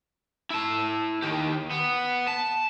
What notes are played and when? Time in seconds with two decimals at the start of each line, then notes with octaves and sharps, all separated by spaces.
0.50 E4 A5
1.22 D#3 G4
1.71 B3
2.27 A5